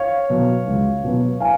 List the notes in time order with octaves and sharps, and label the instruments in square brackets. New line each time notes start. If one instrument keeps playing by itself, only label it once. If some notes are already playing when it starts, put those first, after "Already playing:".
Already playing: [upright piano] C#5 F5
B2 F#3 B3
C#2
B2 F#3 B3
F5 G#5